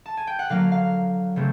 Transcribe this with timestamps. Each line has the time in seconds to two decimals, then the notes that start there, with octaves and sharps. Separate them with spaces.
0.06 A5
0.17 G#5
0.27 G5
0.39 F#5
0.50 D3 F#3 A#3 F5
0.72 F5
1.36 C#3 E3 A3 C4